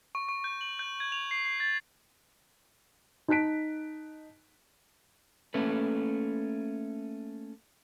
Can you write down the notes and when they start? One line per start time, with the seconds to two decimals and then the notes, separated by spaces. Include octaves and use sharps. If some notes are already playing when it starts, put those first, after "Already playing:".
0.15 C#6
0.29 C#6
0.44 G6
0.61 F#7
0.79 G6
1.00 G#6
1.12 F7
1.31 C7
1.45 C7
1.60 A6
3.28 D#4 A5 F#6 B6 D7
5.54 A3 A#3 C#4 A4 B4